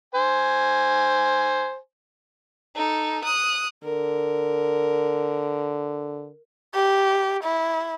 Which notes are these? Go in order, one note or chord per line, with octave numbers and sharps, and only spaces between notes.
C5 G#5
D#4 A4
D#6 F#6
D3 A#4
G4
E4